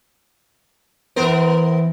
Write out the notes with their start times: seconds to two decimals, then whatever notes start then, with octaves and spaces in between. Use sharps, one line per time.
1.16 E2 E3 B3 A#4 C5